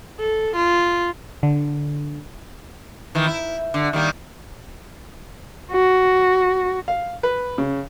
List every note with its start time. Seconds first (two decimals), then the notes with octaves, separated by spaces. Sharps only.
0.19 A4
0.56 F4
1.43 D3
3.15 D#3 E3
3.26 E4
3.74 D3
3.93 D#3 G3 A#3
5.72 F#4
6.88 F5
7.23 B4
7.58 C#3